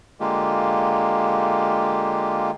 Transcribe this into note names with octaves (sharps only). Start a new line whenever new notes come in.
D3 G#3 A#3 F4 G4